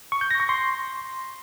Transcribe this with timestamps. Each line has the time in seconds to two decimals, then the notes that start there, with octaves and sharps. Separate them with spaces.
0.12 C#6
0.21 G6
0.31 A#6
0.40 C#6
0.49 C6